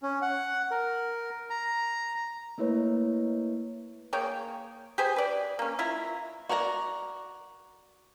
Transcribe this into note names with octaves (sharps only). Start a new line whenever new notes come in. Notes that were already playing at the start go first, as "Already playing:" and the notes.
C#4
F#5
A#4
A#5
A3 A#3 E4 B4 C#5
A#3 G#4 C#5 G5
G4 G#4 C5 G#5
B4 D5
A#3 C#4
E4 F4 E5 A#5
F#4 A#4 D5 G#5 A#5